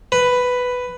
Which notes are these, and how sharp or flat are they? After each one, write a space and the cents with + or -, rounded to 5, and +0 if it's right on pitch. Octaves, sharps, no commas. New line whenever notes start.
B4 +5